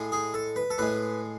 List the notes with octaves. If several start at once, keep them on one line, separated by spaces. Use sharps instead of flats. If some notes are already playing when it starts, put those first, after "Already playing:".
Already playing: A2 G#3
G#4
A4
B4
A4
A2 G#3 B4